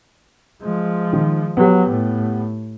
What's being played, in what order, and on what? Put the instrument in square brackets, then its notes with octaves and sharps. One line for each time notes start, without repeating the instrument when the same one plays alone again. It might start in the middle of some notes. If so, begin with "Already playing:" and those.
[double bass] F3 G#3
[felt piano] D#3
[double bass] F#3 [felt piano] B3 G4
[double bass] A2